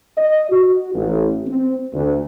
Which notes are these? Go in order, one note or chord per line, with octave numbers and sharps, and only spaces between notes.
D#5
F#4
A1
C4
D2